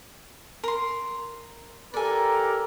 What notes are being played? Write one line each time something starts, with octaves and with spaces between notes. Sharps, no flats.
A#4 C6
G4 A4 A#4 D5 G#5